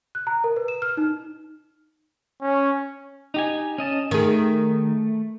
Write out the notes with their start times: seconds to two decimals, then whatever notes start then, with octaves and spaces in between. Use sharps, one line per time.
0.15 F#6
0.27 A#5
0.44 A#4
0.57 B4
0.68 E7
0.82 F6
0.97 D#4
2.41 C#4
3.34 D#4 G4 G#5
3.78 C#4 D#5 A5
4.11 D#3 A3 G#4